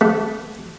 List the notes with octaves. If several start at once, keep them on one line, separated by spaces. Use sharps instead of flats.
A3